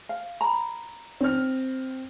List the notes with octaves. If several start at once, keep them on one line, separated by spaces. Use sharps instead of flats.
F5
A#5 B5
C4 F6